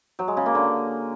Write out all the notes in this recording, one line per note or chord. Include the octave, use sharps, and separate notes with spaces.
F#3
G#3
C#3
A#3
D3